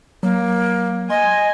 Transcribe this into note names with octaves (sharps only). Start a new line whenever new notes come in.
F#3 A#3
D#5 G#5 C6